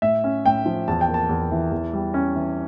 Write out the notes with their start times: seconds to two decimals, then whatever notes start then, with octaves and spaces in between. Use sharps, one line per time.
0.02 A2 E5
0.24 C#4
0.46 A2 G5
0.66 F3
0.88 E2 A5
1.01 G5
1.08 A#3
1.14 A5
1.29 E2
1.51 E3
1.71 E2
1.93 G3
2.14 C#4
2.35 E3